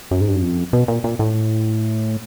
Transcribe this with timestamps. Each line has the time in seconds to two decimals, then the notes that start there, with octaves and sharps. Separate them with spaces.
0.11 F#2
0.21 G#2
0.28 G2
0.36 F#2
0.42 F2
0.73 B2
0.88 A#2
1.04 A#2
1.19 A2